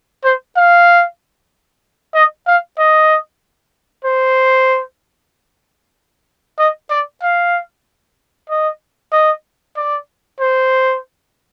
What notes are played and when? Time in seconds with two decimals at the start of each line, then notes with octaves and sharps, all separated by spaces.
0.24 C5
0.56 F5
2.14 D#5
2.47 F5
2.78 D#5
4.05 C5
6.59 D#5
6.90 D5
7.22 F5
8.49 D#5
9.12 D#5
9.77 D5
10.40 C5